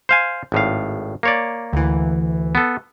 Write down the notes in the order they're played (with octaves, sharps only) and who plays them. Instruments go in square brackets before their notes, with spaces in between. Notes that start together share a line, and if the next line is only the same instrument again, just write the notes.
[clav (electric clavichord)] C5 F5 G#5
G#1 A2 F5
A#3 C#5 D5
[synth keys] D2 E3
[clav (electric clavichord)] B3 A4